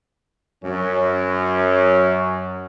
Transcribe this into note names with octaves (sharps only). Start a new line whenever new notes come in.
F#2 C#4